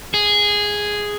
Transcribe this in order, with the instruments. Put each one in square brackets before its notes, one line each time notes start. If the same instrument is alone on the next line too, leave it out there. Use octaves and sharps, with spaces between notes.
[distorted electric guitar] G#4